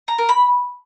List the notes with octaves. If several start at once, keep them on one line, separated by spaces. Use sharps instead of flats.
A#5
A#4
B5